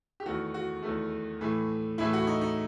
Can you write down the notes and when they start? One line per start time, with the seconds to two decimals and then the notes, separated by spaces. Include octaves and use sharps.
0.20 G4
0.26 E2 D#3 A3 F#4
0.54 F#4
0.83 E2 D#3 A3
1.41 A2 E3 A3
1.98 A2 E3 A3 E4
2.13 F#4
2.27 D#4
2.41 D#4